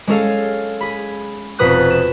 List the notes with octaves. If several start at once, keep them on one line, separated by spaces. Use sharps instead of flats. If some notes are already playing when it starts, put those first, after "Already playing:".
G#3 C#4 G#4 A4 F5
G#4 B5
F1 F2 B2 B4 D#6 F#6
E7